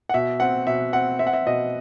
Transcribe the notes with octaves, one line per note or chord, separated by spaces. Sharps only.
F#5
B2 E5
C4 F#5
B2 E5
C4 F#5
C4 E5
F#5
E5
B2 D#5